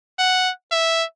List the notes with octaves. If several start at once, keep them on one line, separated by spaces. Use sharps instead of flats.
F#5
E5